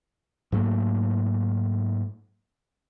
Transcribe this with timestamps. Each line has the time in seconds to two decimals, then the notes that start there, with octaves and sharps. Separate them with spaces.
0.52 G#2 F#3 A3 A#3